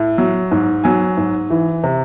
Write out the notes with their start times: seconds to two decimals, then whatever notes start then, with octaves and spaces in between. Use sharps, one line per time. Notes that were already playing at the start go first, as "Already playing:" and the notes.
Already playing: A2
0.18 F#3
0.52 G#2
0.84 F#3 G#5
1.17 G#2
1.50 E3
1.84 C3